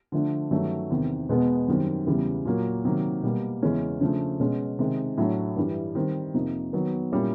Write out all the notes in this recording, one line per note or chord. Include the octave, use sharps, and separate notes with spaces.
D3 F3 A3 D4
G2 D#3 F#3 A3 C#4
E2 C3 D#3
E2 B2 G#3 B3
F#2 D#3 G3 C4
E2 C#3 E3 G3
A#2 F#3 A#3
C3 D#3 F#3 A#3
B2 G3 A#3
E2 C#3 E3 G#3 C#4
C#3 F3 A3 D4
B2 G#3 C#4
C3 D#3 G#3
A2 F#3 A3 D4
G2 E3 G3
D#3 G3 C4 D#4
F2 C3 F3 A#3 D#4
D#3 F#3 B3
A#2 G3 A#3 C#4 E4